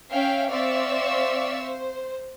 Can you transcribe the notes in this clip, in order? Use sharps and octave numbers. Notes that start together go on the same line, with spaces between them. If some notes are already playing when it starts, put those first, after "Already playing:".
C#4 E5 F5 G5
C4 D5 E5 F5 C#6 E6
C5